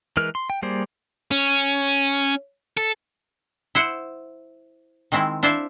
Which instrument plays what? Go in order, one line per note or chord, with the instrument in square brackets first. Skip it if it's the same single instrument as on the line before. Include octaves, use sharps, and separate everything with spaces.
[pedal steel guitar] E3 G#3 A#4 B4 F6
C6
G5
G3 A#3 G#4 C5 D5
[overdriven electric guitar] C#4
A4
[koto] E4 C5 F#5
D#3 G#3 C4 E4
D4 E4 C5 D5 E5 F5